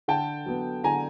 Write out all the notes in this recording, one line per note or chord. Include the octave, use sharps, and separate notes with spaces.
D3 G5 A5
F#3 B3
D3 G#5 A#5